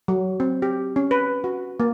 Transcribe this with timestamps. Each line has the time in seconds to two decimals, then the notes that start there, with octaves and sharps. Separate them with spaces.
0.08 F#3
0.40 C4
0.62 G4
0.96 C#4
1.11 B4
1.44 F#4
1.80 A#3